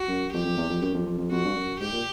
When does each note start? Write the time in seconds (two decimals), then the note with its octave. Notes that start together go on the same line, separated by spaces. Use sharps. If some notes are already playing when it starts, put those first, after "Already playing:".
Already playing: F#4
0.08 F#2
0.33 F2 G4
0.45 F2
0.57 E2
0.70 F2
0.82 F#2
0.94 F2
1.06 F2
1.18 F2
1.31 F2 F#4
1.45 G2
1.56 F#2
1.80 G#2 G4
1.92 A#2